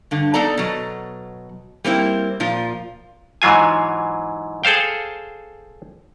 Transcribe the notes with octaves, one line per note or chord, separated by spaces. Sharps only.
G2 D3
B3 D#4 A4 D5 A#5
B2 F#3
G3 A#3 C4 E4
A#2 F3 F4
G#2 E3 F#3 F4 G#5
G#4 A4 C5 F5 G5